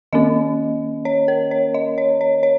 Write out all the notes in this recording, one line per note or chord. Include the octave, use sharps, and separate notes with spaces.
D#3 A#3 C#4 D#5
C#5
A#4
C#5
D#5
C#5
C#5
C#5